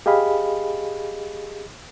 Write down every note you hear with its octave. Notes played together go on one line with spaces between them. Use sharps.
G4 G#4 D#5 F5 B5